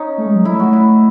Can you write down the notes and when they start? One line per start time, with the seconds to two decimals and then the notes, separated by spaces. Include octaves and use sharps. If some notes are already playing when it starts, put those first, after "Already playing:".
Already playing: C#4 D#4
0.18 A3
0.26 G#3
0.35 F#3
0.45 A3 E4
0.60 F#4
0.73 E4